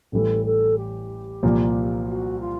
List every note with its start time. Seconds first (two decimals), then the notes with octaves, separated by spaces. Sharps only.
0.12 A1 A2 E3 G3 A4
0.45 A4
0.77 G4
1.43 C2 A#2 F3 A#3
2.08 F#4
2.41 F4